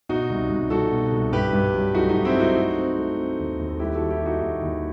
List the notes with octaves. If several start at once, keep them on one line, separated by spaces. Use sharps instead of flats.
B2 D#4 F#4
C2
C2
C2 F#4 A4
B2
C2
G2 G4 B4
G2
F#3
A3 D#4 F#4
D#4
G2
C4 E4
G2
D#4 F#4
A3
C4
A3
C4
D#2
D#2
A4
G3 E4 G4
F#4 A4
D#3
E4 G4
D#3 D#4 F#4
D#2
D#2